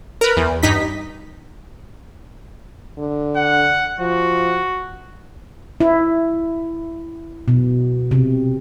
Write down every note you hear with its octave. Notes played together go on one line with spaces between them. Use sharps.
A#4 B4
E2
G2 D#4 B6
D3
F#5
F3 F#4
E4
B2
C3